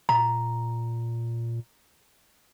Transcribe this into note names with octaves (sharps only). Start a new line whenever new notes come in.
A#2 A#5